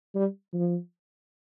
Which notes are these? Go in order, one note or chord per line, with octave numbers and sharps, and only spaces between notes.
G3
F3